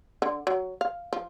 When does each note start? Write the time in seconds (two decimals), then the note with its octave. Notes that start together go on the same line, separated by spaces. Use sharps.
0.22 D3
0.47 F#3
0.81 F5
1.13 F3